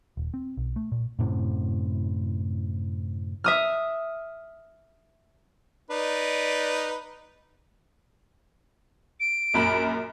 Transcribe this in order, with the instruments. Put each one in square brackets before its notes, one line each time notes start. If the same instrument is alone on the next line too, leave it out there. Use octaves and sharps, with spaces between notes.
[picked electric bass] D#1
C4
B1
A3
A#2
F#2 A2 C3
[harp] E5 D#6 F6
[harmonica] D#4 B4 D5
[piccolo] D7
[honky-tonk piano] A#1 F#2 B5